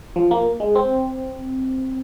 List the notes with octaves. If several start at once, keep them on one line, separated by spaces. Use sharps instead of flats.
F3
A#3
G#3
C4